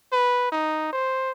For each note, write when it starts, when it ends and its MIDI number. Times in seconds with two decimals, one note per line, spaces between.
0.12 0.49 71
0.52 0.89 63
0.93 1.31 72